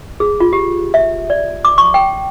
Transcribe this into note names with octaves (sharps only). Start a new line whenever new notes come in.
G#4
F4
G4
E5
D5
D6
C#6
G5